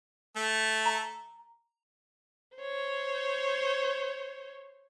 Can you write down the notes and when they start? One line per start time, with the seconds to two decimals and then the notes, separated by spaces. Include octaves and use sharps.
0.36 A3 A4
0.86 A#5
2.56 C5 C#5